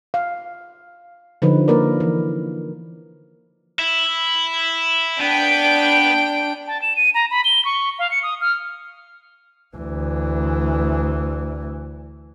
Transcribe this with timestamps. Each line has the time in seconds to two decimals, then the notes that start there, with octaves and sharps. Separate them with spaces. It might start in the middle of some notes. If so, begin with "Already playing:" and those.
0.14 F5
1.42 D3 F3 D#4 B4
1.68 A#3 A#4 B4 D5
2.00 E3
3.79 E4
5.21 B3 D4 G5 D7
6.67 A5
6.82 E7
6.96 D#7
7.14 A#5
7.31 B5
7.45 G7
7.65 C#6
7.99 F5
8.11 C#7
8.23 D#6
8.41 F6
9.76 D2 E3